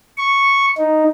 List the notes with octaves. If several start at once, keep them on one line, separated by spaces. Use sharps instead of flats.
C#6
D#4